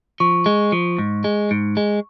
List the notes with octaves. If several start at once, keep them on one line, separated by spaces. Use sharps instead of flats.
F3 C#6
G#3
F3
G#2
G#3
G#2
G#3